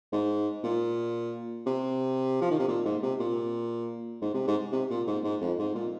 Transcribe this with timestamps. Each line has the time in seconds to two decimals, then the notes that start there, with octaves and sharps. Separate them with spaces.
0.12 G#2
0.64 A#2
1.66 C3
2.41 F3
2.51 D#3
2.59 C3
2.68 A#2
2.85 G#2
3.02 C3
3.20 A#2
4.21 G#2
4.34 C3
4.47 G#2
4.72 C3
4.90 A#2
5.07 G#2
5.24 G#2
5.41 F2
5.59 G#2
5.75 A#2